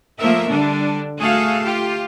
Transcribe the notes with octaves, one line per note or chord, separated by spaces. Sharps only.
F3 A3 A#3 A#4 E5
D3 G3 D4
A3 F#4 G#4 A4 F5
F4 G4